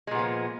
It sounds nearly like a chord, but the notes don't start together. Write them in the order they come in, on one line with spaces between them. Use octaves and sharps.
G#3 A#2 B3 F3